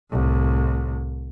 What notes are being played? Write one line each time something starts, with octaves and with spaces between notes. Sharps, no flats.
C2 A2